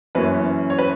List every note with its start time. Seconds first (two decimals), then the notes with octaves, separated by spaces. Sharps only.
0.15 F#2 E3 A#3 C#4 B4
0.70 C#5
0.79 B4